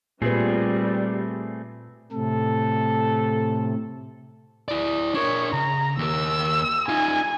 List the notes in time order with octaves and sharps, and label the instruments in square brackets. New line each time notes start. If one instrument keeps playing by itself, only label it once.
[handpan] A#2 B4 [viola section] G3 [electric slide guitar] A3 C4 G#4
[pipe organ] A2 C3 [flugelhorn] A4
[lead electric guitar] E4 D5
[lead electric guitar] D4 A#4 [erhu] C#5
[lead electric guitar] C#3 [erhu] A#5
[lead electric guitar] D#2 A#4 [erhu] E6
[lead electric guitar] D#4 F4 [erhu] G#5